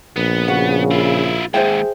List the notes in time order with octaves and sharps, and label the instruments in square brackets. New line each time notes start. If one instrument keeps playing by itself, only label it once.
[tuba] A#1 [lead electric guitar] B3
[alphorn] C#3 [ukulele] F#4 F#5
[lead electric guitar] E4 F4
[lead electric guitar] D#2 G#2 [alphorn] G#4 [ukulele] C5 E5 G5